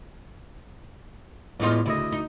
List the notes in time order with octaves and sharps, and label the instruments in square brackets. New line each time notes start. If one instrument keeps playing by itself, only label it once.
[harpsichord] E2 G#3 [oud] A2 D#4 F4
[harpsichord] D2 E4 D#5 [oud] C#3
[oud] D#4